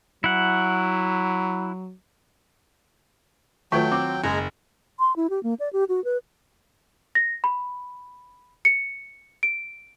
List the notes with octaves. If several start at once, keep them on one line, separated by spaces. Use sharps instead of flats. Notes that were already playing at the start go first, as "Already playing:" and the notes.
F#3 E4 F#5
D#3 F#3 A3 F4 B4 G5
C4 D6
F#1 G#3 G#5 A#5
C6
E4
G4
A#3
D5
G4
F#4
B4
A#6
B5
C#7
D7